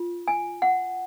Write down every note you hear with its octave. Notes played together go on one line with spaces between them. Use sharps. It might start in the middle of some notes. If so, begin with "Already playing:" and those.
Already playing: F4
G#5
F#5